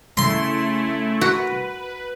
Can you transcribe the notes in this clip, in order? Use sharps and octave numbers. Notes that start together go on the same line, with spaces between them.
C#3 A3 C#4 E4 C6
F#4 A#4 B4